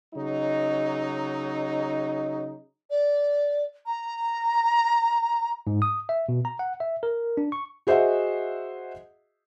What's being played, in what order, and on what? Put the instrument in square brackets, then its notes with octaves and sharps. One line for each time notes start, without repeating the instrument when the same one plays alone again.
[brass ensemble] C#3 F#3 D#4
[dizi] D5
A#5
[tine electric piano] G#2
D#6
E5
B2
A#5
F#5
E5
A#4
D4
C#6
[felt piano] F#4 G#4 C5 D#5 E5 F#5